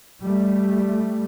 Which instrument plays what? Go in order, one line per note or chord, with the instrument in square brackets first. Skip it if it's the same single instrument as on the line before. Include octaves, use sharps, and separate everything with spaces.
[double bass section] G3 A3